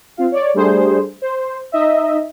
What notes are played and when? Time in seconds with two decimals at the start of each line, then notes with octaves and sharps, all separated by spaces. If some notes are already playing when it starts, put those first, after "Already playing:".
0.17 C4 F4 F5
0.32 C#5 D5
0.54 G3 A3 D4 G#4 C5
1.22 C5
1.72 D#4 D#5 E5